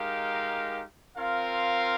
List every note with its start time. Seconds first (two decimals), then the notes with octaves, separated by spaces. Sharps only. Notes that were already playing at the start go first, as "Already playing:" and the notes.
Already playing: G#3 D#4 G4 A#4 F5
1.17 C4 F4 A#4 F5